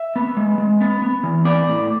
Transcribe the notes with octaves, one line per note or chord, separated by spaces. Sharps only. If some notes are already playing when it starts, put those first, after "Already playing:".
Already playing: E5
B3
G#3
G#3
B3
B3
E3
B3 D5
A2